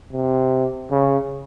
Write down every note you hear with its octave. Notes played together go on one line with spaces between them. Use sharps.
C3
C#3